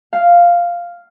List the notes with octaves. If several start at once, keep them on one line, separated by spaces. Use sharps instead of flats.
F5